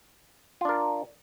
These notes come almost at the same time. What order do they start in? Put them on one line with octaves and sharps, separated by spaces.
F4 D4 A#4